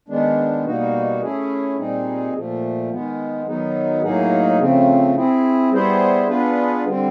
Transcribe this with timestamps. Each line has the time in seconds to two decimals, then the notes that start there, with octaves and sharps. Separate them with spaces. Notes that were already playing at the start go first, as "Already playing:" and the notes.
0.08 D#3 G#3 B3 D4
0.65 B2 G3 A#3 D#4 F#4
1.21 A3 C#4 E4 G#4
1.77 A#2 G3 C4 D#4 G#4
2.33 A#2 F3 A3
2.90 D#3 G#3 B3
3.46 D#3 F#3 B3 D#4
4.03 A2 F#3 A#3 D#4 G#4
4.59 C#3 F3 A3 C4
5.15 C4 E4 G#4
5.71 G3 B3 E4 G#4 C5
6.28 B3 D4 F4 G#4 B4
6.85 D3 G3 C4